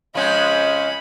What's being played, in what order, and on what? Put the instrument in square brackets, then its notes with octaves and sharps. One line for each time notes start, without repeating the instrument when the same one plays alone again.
[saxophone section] F2 C#3 C#4 [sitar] F3 G#3 C4 [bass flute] D#5 [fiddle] B5